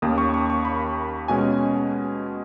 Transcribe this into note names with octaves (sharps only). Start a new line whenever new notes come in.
D#2 D#3 A#3 C#4 D#6
C#6
C#6
C#6
B5
B2 G#3 C#4 G#5